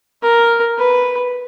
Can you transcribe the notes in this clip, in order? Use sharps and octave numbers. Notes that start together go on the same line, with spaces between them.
A#4
B4